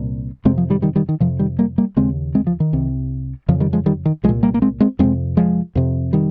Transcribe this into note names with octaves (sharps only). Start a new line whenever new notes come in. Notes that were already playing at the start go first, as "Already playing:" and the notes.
Already playing: C2 A#2
F2 C3 G#3 C4
F3
D#3 G3
D#3 G3
D#3 G3
D#3
F2 C3 F3
D#3 G3
G3 A#3
G3 A#3
D#2 C#3 G#3 C4
G#3 C4
F3
D#3
C2 C3
F2 C#3 F3
D#3 G3
F3 G#3
D#3 G3
D#3
C2 F3 G#3
A#2
G3 A#3
A#3
G#3 C4
G#3 C4
F2 C3 G#3 C4
F3 G#3
F2 C3
D#3 G3